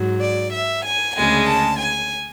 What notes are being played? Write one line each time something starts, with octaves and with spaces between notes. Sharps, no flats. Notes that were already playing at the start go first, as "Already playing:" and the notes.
Already playing: G#2 F#3
D5
E5
G#5
D2 C#3 G#3 G#5
A5
G#5